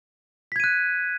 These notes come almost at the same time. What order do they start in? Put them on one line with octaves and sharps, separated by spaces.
B6 G#6 D#7 F#6